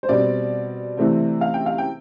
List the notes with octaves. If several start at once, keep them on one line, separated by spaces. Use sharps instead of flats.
C5
B2 G3 C4 D5
C3 E3 A3 C4
F5
G5
F5
G5